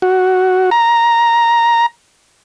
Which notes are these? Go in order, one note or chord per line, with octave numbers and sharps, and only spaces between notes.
F#4
A#5